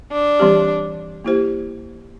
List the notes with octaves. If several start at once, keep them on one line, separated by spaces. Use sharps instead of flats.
D4
E3 G3 C4 G4
A#3 E4 G4 C5